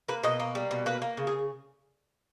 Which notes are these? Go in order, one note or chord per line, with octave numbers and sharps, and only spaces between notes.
A#3 B4
B2 D#5
A#3
G3
B2
A#3 B4
A#3
C#3
G#4